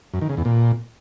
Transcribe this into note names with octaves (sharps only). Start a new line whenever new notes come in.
F#2
D#3
C#3
E2
A#2